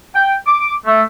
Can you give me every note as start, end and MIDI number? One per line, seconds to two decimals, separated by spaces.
0.16 0.35 79
0.46 0.73 86
0.86 1.01 57